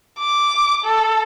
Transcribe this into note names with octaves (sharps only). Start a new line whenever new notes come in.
D6
A4